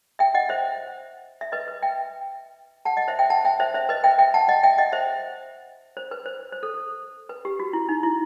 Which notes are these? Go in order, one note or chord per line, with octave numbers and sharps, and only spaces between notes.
E5 G5
D#5 F#5
C5 E5
E5
B4 D#5
B4
E5 G5
F#5 A5
D#5 F#5
C5 E5
E5 G5
F#5 A5
E5 G5
C5 E5
C5 E5
B4 D#5
E5 G5
E5 G5
F#5 A5
D#5 F#5
E5 G5
D#5 F#5
C5 E5
C5
B4
C5
C5
A4
A4
B4
G4
F#4
E4
D#4
E4